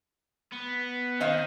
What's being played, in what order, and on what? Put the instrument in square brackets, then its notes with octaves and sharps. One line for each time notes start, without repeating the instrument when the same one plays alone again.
[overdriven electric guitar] B3
[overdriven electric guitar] D#3 [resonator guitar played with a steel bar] C5 D#5 F5